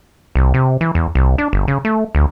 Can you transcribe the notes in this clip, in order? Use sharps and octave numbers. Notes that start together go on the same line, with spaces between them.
C2
C3
E3
E2
C2
D4
G1
C#3
A3
D2